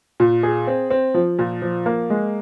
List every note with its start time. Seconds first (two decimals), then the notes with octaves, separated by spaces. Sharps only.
0.20 A#2
0.43 G#4
0.67 C4
0.90 C4
1.14 F3
1.39 A#2
1.62 F3
1.86 A#3
2.10 G#3